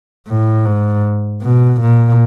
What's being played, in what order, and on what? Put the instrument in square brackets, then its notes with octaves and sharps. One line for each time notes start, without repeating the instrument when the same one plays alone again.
[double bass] A2
G#2
B2
A#2